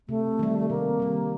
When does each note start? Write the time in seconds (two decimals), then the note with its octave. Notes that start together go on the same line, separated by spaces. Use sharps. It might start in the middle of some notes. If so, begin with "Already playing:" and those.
0.08 C3 A3
0.39 D#3 G3
0.59 A3
0.69 C3 A#3
1.00 D#3 G3